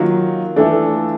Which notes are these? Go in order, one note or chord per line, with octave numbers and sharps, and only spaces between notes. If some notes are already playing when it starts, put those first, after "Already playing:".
Already playing: D#3 F#3 A#3 F4
E3 A3 D4 A4